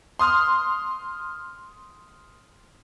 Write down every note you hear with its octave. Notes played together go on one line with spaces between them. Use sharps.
C6 D#6 F6